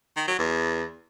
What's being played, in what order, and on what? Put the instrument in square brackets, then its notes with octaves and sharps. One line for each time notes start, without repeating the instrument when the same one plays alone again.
[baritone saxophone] D#3
F#3
E2